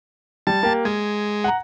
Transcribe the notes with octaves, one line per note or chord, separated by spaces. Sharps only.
G3 A5
A#3 G4
G#3 G#6
F#5 A#5